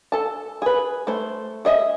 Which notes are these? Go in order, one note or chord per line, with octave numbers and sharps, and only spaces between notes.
A4 A5
G#4 B4
A3 C5
G#4 D#5 E5